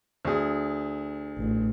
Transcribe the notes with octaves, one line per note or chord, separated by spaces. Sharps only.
D2 G#4
A1